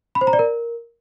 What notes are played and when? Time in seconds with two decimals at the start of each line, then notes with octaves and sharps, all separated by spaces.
0.15 B5
0.21 C5
0.27 A#5
0.33 D5
0.39 A#4